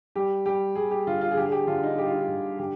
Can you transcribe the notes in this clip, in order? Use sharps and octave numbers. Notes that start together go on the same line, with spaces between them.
G3 G4
G3 G4
G3 G#4
G4
D3 F4
F4
G#4
D3 G4
G#4
G4
D3 F4
D#4
G3 G4
F4
D#4
F4
D3
D3 G4